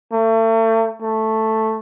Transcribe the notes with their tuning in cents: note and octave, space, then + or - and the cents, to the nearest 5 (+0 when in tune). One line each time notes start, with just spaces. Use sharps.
A3 +35
A3 +0